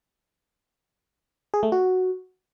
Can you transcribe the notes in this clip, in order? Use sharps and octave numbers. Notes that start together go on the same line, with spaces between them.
G#4
A3
F#4